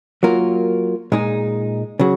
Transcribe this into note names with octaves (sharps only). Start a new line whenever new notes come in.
F#3 A#3 F4 A#4
A#2 G#3 D#4 G#4
C#3 F#3